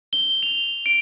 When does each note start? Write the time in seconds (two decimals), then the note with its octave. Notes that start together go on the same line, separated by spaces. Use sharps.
0.13 G7
0.43 F7
0.86 D7